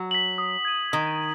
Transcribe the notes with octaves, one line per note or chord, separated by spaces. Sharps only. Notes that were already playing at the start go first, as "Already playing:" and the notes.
Already playing: F#3
B6 F#7
D#6
G#6 D#7
D#3 D#6